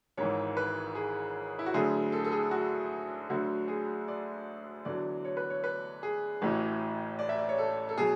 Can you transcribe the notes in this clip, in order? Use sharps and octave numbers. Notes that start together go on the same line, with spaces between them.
G#1 G#2 E3 C#5
B4
G#4
E4
F#4
D2 D3 F#3 G#4
A4
A4
G#4
F#4
D2 D3 F#3 F#4
G#4
D5
E2 D3 F#3 D5
C#5
B4
C#5
B4
G#4
A1 A2 E3 F#4
D5
E5
D5
C#5
A4
A4
B2 F#3 G#4